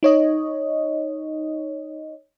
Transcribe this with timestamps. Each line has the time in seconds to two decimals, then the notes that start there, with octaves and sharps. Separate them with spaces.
0.03 D#4 C#5 D#5